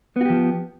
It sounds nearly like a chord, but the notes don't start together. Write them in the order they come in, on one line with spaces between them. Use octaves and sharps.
B3 F#4 G4 F3